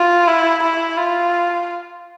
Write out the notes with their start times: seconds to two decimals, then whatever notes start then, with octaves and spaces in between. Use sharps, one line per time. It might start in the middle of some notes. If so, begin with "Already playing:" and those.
Already playing: F4
0.28 E4
0.63 E4
0.98 F4